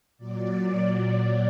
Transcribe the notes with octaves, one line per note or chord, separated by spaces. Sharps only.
A#2 F#3 D5